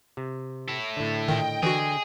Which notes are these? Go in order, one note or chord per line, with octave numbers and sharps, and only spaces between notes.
C3
E4 A4
A2 D3
A#2 D#3 D#5 G5
D3 E3 F#4 G#4